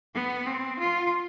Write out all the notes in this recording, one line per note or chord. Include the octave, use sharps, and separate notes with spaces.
B3
C4
F4